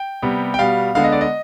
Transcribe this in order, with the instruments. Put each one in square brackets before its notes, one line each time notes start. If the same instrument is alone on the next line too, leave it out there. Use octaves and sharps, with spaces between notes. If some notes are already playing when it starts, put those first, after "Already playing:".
Already playing: [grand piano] G5
C3 G3 B3
G5
B2 G3 B3 F5
D3 G#3 B3 F5
D#5
D5
D#5